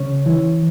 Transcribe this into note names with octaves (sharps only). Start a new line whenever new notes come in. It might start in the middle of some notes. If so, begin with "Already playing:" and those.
Already playing: C#3 C#5
E3